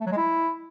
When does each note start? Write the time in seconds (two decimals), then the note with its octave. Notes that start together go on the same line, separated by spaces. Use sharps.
0.01 A3
0.06 F#3
0.12 G#3
0.17 E4